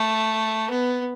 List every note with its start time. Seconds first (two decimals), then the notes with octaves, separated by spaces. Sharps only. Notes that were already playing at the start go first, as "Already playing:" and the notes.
Already playing: A3
0.70 B3